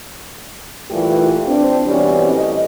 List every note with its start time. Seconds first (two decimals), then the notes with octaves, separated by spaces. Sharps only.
0.91 A#2 E3 G3 A3 F4 G4
1.48 C4 D4
1.86 B2 E3 G3 C4 C#4 D5
2.29 A2 D#5